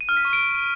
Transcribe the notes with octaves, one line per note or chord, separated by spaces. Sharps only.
D#7
F6
B6
C#6
D7